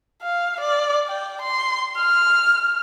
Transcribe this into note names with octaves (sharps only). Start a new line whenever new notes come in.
F5
D5
G5
C6
F6